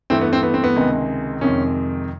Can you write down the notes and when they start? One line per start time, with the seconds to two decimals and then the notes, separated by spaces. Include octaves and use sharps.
0.10 G2 E3 A3 C4
0.21 B3
0.33 C4
0.43 B3
0.54 C4
0.64 B3
0.76 C#2 C3 D#3 G#3
1.41 F2 C3 D#3 G#3 C#4